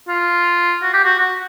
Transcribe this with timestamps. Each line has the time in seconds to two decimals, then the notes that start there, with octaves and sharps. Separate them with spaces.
0.08 F4
0.82 F#4
0.93 G4
1.04 F#4
1.19 F#4